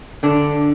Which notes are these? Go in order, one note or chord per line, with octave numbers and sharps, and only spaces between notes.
D3 D4